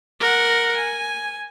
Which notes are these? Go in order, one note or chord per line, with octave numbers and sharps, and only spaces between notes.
A#4 F#5
G#5